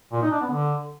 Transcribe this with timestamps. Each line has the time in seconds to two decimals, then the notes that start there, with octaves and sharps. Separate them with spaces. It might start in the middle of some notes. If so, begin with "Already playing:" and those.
0.13 A#2
0.22 D#4
0.32 D4
0.41 B3
0.51 D3